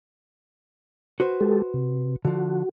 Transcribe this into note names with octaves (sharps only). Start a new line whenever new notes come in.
F#4 B4 C5
G#3 G4 A4
C3
D3 F3 F#4